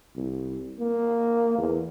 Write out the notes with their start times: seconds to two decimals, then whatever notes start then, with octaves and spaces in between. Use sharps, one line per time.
0.16 C2
0.80 A#3
1.58 E2